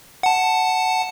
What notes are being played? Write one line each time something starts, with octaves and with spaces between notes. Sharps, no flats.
F#5 A5